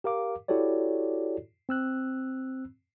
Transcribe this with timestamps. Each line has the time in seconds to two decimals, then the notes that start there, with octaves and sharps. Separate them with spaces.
0.04 G4 A#4 F5 D6
0.48 E4 F#4 G4 A4 C#5 D5
1.69 C4 E6 F#6